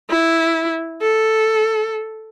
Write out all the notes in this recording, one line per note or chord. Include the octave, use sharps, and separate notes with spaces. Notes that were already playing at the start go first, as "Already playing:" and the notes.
E4
A4